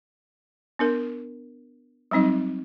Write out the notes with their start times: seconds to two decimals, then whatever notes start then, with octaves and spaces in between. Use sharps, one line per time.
0.79 B3 D4 A#4
2.11 F#3 G3 C4 D#4 D#5